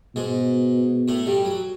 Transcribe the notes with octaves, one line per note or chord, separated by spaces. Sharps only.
G#2 B2 G#3
A2 A3
G2 G3
F#3